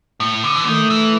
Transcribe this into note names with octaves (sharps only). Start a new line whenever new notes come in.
A2
D3
E3
D#3 A3
E3